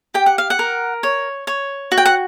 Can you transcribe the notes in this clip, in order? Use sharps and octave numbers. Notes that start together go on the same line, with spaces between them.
G4 G5
F#5
F5
F#5
A#4
C#5
C#5
F#4
G5
F#5